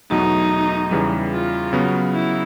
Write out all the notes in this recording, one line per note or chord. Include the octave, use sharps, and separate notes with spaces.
E2 B2 F#3 A3 D#4
E2 C#3 E3 G3
F4
C#3 F#3 B3
E4